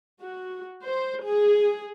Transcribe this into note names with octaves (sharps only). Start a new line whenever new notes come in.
F#4
C5
G#4